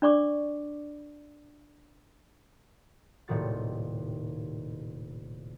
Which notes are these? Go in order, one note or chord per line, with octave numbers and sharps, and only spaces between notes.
D4 D5 C#6 D6
D#1 A2 C3 D#3 F#4 A6